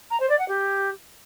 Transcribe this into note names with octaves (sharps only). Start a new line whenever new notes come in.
A#5
C5
D5
F#5
G4